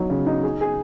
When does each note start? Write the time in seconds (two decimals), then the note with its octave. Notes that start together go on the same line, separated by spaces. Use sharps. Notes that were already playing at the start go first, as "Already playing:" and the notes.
Already playing: F#3 D#4
0.10 C#3
0.26 D#4
0.43 G#4
0.61 G#4